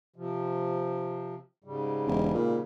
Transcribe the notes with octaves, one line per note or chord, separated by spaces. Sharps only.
C3 F3
G#2 C#3 G3
E1
A#2